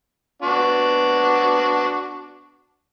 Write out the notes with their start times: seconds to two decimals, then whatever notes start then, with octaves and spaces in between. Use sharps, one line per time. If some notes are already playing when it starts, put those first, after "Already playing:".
0.42 B3 D4 F#4